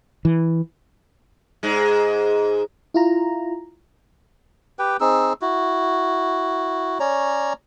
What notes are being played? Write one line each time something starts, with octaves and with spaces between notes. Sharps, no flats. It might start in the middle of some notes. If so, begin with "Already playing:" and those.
E3
G#2 G#3
E4 F4 A#5
G4 B4 G5
C4 D#4 G#4 E6
E4 F#4
C#4 C#5 D5 A#5